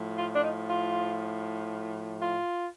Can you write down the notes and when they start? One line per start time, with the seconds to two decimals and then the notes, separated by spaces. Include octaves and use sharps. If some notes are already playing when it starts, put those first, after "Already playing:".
Already playing: A2 F3
0.18 F4
0.35 D4
0.43 D#4
0.68 F4
2.21 F4